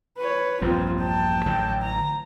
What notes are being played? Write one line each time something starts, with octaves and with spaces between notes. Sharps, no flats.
B4 C#5
A#1 E2 G2 C4 F4
G5 A5
A1 D3 F#3
A#5